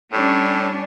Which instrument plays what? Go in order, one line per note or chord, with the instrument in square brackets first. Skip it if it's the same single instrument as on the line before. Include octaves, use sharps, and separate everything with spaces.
[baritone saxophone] A2 [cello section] G3 C#4 D4